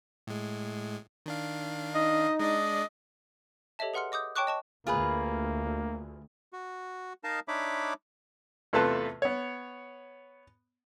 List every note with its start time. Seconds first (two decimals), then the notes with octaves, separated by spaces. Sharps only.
0.27 A2 G#3
1.26 D#3 D4 F5
1.95 D#4 D#5
2.40 G#3 D4 D5 D#5
3.79 G4 A4 C#5 D#5 E5 A5
3.94 G#4 B4 F#5 C6 F6 C#7
4.12 D#5 D6 D#6 G6
4.36 C#5 G5 A5 C#6 D6 F#6
4.47 D#5 A5 C#6
4.87 D2 A#3 F4 G#4 B4
6.53 F#4
7.24 D#4 A#4 D#5 F5 A5
7.48 D4 D#4 C#5 E5 B5 D6
8.73 E2 C3 A3 F4 B4 A5
9.22 B3 C#5